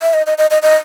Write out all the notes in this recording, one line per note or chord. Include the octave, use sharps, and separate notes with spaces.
E5
D#5
D#5
D#5
D#5
D#5